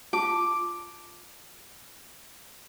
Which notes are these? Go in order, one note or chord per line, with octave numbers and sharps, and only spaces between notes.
F4 A5 D6